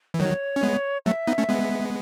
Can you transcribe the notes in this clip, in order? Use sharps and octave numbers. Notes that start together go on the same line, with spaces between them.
E3
D#3 F#3 C#5
C#4
G#3 B3
F#3 A3 E5
B3 D#4
A3 C#4
G#3 B3